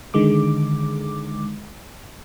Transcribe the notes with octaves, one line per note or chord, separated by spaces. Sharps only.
D3 D#3 G#3 D6